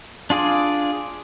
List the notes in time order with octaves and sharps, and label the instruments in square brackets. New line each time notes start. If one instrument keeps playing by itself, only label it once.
[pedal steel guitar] D4 F4 G#4 D5